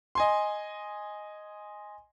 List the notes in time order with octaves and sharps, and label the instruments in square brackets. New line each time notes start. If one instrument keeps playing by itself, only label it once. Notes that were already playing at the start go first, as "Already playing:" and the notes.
[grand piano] D#5 G#5 C6